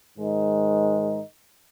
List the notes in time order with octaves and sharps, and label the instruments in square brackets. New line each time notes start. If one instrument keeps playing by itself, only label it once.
[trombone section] G#2 D#3 G#3 D#4